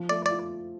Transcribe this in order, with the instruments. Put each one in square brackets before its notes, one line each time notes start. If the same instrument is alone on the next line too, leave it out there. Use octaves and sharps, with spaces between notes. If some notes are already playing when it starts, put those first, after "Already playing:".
Already playing: [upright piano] F3
[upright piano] A3 [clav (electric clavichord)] D5
[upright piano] F4 [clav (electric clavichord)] D5